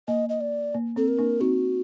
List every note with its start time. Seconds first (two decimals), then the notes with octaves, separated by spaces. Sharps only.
0.08 A#3 D#5
0.29 D#5
0.41 D5
0.74 A#3
0.96 C4 A4
1.08 A#4
1.18 A#3 D4
1.40 C4 D#4 F#4